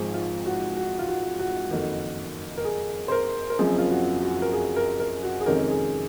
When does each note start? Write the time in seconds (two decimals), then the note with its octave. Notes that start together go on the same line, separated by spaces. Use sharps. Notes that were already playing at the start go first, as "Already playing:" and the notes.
Already playing: G#1 G#2 F3 G#4
0.14 F4
0.46 F#4
0.77 F#4
0.99 F4
1.08 F#4
1.39 F#4
1.71 F#1 F2 D#3
2.57 A#4
2.65 G#4
3.08 C5
3.12 A#4
3.50 A#4
3.59 F#1 F#2 C#3 F3 C4 G#4
3.78 F4
3.90 F#4
4.22 F#4
4.42 A#4
4.53 G#4
4.76 A#4
5.00 A#4
5.23 F#4
5.41 G#4
5.46 F2 C3 D#3 G#3 C#4 A#4
5.59 A#4
5.71 G#4